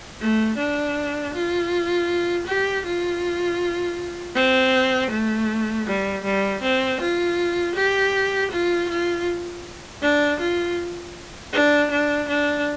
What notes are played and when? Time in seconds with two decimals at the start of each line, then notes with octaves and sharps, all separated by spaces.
0.21 A3
0.58 D4
1.34 F4
2.47 G4
2.85 F4
4.35 C4
5.11 A3
5.87 G3
6.24 G3
6.62 C4
7.01 F4
7.75 G4
8.51 F4
8.89 F4
10.02 D4
10.40 F4
11.53 D4
11.91 D4
12.28 D4